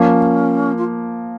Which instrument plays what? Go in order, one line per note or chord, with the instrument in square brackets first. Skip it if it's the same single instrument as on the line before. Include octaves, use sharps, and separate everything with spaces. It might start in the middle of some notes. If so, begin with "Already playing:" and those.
Already playing: [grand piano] F3 A#3 [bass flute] C#4
[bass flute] F4